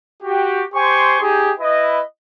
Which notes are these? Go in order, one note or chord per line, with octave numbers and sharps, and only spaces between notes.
F#4 G4
G4 C5 G#5 C6 C#6
D#4 G4 G#4
E4 B4 D#5